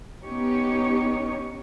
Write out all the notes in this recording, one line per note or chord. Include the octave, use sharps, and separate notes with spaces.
B3 C#4 D#4 G4 C#5